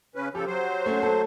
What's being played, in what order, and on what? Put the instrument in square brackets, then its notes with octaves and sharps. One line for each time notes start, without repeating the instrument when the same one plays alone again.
[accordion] C#3 C#4 B4
[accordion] C#3 F3 A4 [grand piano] G4
[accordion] F#3 C5
[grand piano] A3 C#4
A3 A4